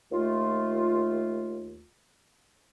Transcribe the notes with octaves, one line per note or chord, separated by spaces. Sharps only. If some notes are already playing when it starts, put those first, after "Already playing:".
D#2 A3 F4